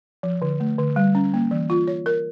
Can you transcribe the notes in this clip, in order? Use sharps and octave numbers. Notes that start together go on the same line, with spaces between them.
F3
D3
A3
D3
G3
C#4
A#3
E3
F4
C#5
A#4